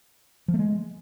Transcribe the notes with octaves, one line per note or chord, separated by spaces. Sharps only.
F3
A3
G#3